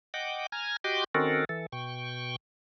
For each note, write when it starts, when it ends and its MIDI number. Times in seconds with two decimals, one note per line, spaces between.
0.14 0.46 75
0.14 0.46 78
0.14 0.46 79
0.14 0.46 86
0.52 0.76 80
0.52 0.76 82
0.52 0.76 89
0.52 0.76 92
0.84 1.04 66
0.84 1.04 67
0.84 1.04 75
0.84 1.04 79
0.84 1.04 84
0.84 1.04 86
1.15 1.45 51
1.15 1.45 60
1.15 1.45 61
1.15 1.45 66
1.15 1.45 69
1.15 1.45 70
1.49 1.66 52
1.49 1.66 69
1.72 2.36 47
1.72 2.36 79
1.72 2.36 85